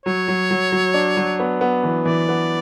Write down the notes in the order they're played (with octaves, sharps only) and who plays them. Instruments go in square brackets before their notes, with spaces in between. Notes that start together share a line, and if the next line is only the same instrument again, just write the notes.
[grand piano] F#3 [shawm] C#5
[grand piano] F#3
F#3
F#3
D4
F#3
B3
B3
E3
[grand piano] E3 [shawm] D5
[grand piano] B3